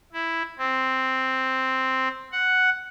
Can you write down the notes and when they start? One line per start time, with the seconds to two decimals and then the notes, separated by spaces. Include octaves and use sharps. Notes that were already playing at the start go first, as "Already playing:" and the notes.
0.13 E4
0.58 C4
2.32 F#5